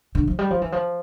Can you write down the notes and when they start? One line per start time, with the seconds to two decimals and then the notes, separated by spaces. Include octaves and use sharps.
0.15 D3
0.28 F3
0.39 G3
0.50 F3
0.62 E3
0.72 F3